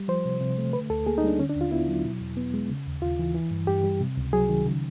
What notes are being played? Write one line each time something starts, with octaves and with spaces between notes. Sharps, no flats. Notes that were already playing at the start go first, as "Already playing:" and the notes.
Already playing: G3
F3 C5
C3
C3
A3
D3 B4
D2 A4
A#3 G#4
D#4
G3 D4
D3 C#4
D4
D#2
F4
B3 E4
F#3
B2
E2
B3
G#3
C#3
D#2
D#2 F4
E3
E3
G2
G2 G4
G3
C3
C#2
F#3 G#4
D#3
C#3